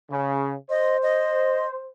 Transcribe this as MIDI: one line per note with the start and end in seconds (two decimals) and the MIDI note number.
0.10 0.54 49
0.70 1.91 72
0.70 0.97 75
1.03 1.66 75